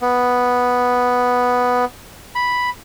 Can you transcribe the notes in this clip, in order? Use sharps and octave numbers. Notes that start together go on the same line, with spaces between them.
B3
B5